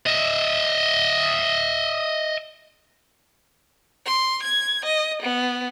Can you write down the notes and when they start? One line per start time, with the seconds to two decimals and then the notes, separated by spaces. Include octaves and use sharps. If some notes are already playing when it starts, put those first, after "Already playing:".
0.07 D#5 E5
4.05 C6
4.43 G#6
4.85 D#5
5.22 B3